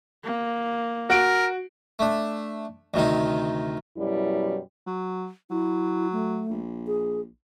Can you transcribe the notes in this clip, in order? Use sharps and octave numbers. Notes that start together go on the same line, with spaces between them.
A#3
F#4 A#4 D7
A3 D4
D2 C3 D#3 D#4
F#2 B2 F#3 G3 E4
F#3
F#3 E4
A3
A#1
G#4